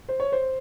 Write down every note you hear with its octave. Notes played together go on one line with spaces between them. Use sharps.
C5
C#5
C5